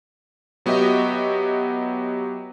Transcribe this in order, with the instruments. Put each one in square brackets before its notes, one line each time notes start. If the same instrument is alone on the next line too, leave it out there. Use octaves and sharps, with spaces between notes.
[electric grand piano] F#3 B3 F#4 G4 D#5 E5